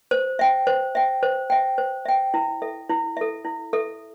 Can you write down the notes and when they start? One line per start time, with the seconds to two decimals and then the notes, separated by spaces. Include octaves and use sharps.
0.11 C5
0.39 E5 G5
0.67 C5
0.95 E5 G5
1.23 C5
1.50 E5 G5
1.78 C5
2.06 E5 G5
2.34 E4
2.62 A4 E5
2.90 E4
3.17 A4 E5
3.45 E4
3.73 A4 E5